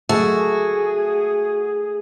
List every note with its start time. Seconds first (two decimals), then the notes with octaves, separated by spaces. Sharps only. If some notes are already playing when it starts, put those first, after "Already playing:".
0.09 A3 F#4 G#4